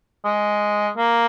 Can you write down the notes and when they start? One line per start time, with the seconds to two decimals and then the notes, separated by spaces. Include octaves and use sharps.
0.25 G#3
0.98 A#3